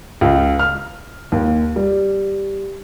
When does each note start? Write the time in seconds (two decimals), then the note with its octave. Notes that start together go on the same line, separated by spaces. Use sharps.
0.21 C#2
0.59 F6
1.32 D#2
1.76 G3